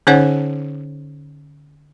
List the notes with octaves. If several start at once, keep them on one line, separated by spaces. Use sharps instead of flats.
D3 C#4 D#4 C5 C#5 F#5